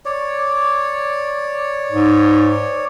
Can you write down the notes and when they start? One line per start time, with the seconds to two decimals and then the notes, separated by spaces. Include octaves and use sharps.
0.05 C#5 D5
1.92 G#2